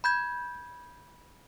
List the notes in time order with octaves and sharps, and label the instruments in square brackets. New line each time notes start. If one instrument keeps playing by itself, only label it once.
[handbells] B5 G6 G#6